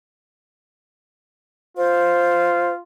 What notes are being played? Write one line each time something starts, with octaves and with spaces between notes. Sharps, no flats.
F4 C5